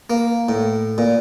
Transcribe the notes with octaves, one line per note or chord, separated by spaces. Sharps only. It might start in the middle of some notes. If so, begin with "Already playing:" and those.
A#3
A2
A#2